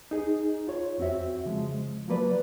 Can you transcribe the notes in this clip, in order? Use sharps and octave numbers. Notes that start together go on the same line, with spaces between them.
D#4 G#4
F4 C#5
F2 C4 F#4 E5
C#3 F3 G#3
F3 F#3 A#3 B4 D5